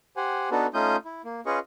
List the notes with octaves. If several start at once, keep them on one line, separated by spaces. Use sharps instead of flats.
G4 C5 F#5 G#5
B3 D4 D#4 F#4 A4 B4
A3 C#4 D#4 F4 D#6 G6
E4
A#3
C#4 F4 G#4 B4 D#5 C#6